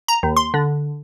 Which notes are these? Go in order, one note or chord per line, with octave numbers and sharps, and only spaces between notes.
A#5
D#2
C6
D3